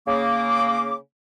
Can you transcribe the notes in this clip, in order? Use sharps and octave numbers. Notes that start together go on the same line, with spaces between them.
C#3 A#3 D6